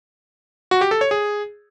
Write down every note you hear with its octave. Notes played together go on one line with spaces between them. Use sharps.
F#4
G4
A4
C#5
G#4